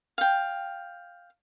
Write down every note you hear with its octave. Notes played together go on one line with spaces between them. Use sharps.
F5 G5